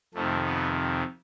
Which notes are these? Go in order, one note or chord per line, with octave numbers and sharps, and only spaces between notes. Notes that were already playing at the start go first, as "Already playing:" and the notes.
F2 C3 D#3 A3
B3